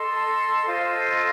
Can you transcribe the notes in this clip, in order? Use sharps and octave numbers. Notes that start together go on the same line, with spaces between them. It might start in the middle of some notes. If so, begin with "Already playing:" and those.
Already playing: A4 D#5 A5 C6
F4 A4 C5 D#5